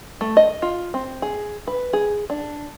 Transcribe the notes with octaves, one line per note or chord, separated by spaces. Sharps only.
A3
D#5
F4
C4
G#4
B4
G#4
D4